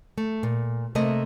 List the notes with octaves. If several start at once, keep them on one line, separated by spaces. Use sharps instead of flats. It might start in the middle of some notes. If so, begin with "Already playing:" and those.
A3
A#2
C3 A3 A#3 D#5